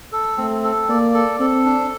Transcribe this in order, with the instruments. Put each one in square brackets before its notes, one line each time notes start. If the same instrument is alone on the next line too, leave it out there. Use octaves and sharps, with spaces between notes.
[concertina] A4
[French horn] A3 [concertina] C4
[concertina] A4
[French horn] A#3 [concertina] D5
[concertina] A4
[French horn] C4 [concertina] A4
[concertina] D4